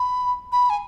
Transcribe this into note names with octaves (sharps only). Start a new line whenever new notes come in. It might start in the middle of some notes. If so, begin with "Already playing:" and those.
Already playing: B5
B5
G#5